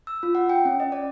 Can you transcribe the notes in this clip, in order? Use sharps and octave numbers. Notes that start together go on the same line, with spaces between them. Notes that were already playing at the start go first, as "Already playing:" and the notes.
E6
F4
F#5
G5
C#4
D#5
D5